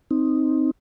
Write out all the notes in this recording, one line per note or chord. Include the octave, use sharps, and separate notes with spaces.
C4 D#4